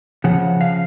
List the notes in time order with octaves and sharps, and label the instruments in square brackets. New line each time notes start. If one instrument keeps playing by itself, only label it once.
[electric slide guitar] C#3 F3 F#5
F5